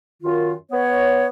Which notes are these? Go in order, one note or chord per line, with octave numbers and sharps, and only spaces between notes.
F#2 D#3 F4
B3 C#5